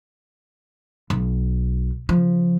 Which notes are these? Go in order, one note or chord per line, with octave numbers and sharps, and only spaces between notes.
B1
C#3 F3